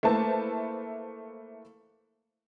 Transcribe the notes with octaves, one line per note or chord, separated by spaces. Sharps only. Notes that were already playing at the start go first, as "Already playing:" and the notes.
A3 A#3 E4 B4 C5 A5